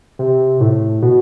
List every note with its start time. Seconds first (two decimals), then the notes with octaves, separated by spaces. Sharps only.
0.19 C3
0.60 A2
1.02 B2